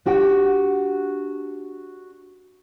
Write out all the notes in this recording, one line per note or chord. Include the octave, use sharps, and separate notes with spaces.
D4 F#4 G4 F#5 G5